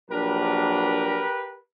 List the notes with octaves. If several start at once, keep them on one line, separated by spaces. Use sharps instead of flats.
A#1 F#3 D4 G4 A#4 B4